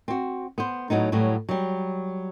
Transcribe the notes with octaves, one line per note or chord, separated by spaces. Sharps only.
C4 F#4
B3 C5
A2 F#3 B3 D#4
A2 F#3 G3 F#4
F#3 G3